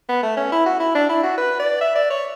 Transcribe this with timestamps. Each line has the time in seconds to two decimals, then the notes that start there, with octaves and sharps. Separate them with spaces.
0.09 B3
0.23 A3
0.37 C#4
0.52 E4
0.66 F#4
0.80 E4
0.95 D4
1.09 E4
1.23 F#4
1.37 B4
1.59 D5
1.81 E5
1.95 D5
2.10 C#5